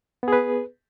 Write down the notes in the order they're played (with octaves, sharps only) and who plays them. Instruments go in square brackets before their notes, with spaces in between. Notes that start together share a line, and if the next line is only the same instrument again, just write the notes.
[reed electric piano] B3
G#4
B4